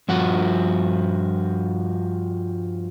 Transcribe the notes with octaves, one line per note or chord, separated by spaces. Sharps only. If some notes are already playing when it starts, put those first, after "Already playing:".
G2 F3 F#4